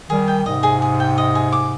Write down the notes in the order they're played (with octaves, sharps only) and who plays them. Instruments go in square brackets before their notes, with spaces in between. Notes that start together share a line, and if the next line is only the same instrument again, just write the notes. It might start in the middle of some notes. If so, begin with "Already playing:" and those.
[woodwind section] D#3 G3 [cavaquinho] G#4
[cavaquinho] G5
[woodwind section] G#2 C3 [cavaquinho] D#5
[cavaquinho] G#4
G#4
G5
D#5
G#4
D6